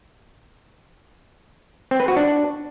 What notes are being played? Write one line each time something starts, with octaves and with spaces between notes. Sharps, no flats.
C4
B4
F#4
D4